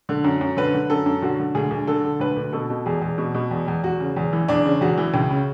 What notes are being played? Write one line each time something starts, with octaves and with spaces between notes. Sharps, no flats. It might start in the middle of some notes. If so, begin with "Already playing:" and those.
D3
F#2
F#2
D3 B4
D3
F#2 A4
F#2
D3 F#4
D3
D2 G#4
D2
D3 A4
D3
D2 B4
D2
B2 A4
B2
E2 G#4
E2
B2
B2
E2
E2
E2 F#4
C#3
E2
E3
E2 D4
C#3
E2 F#4
E3
C#2
C#3